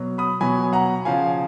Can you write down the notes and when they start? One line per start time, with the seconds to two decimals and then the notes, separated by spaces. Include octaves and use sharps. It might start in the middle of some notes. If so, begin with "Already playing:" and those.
Already playing: B2 F#3
0.18 B5 D#6
0.41 B2 F#3 G#5 B5
0.73 F#5 A#5
1.05 C#3 F3 F5 G#5